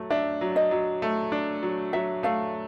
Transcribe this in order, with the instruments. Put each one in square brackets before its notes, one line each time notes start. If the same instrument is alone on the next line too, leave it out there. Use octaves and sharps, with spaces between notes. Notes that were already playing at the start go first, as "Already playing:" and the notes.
Already playing: [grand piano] F#3 A3
[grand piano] D4 [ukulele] E5
[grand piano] F#3
[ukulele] D#5
[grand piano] F#3
A3
D4
F#3
[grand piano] F#3 [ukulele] E5
[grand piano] A3 [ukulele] F5